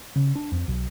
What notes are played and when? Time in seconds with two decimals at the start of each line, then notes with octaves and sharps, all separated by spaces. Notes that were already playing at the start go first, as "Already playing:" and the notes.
0.16 C#3
0.36 D4
0.52 F2
0.68 B1